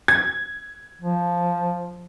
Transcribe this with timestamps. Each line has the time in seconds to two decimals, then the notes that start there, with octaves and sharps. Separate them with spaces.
0.08 G#6
1.02 F3